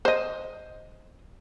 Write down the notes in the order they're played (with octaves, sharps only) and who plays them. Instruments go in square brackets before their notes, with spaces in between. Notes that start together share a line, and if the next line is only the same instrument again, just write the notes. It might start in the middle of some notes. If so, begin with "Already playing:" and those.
[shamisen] C5 D#5